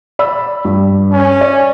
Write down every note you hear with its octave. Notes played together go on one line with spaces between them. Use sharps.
D5 B5 E6
G2
C#4
D5